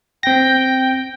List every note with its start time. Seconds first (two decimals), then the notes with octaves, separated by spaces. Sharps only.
0.23 C4 G5 A#6